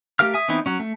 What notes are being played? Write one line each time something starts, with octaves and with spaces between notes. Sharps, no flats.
A3 G4 A#4 F5 F6
E5 G#5 D#6
E3 B3 C4 D#4 E4
F#3 C#4
A3